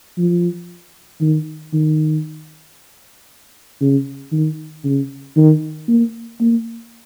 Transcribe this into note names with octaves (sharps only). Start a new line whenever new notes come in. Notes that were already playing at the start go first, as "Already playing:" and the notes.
F3
D#3
D#3
C#3
D#3
C#3
D#3
A#3
A#3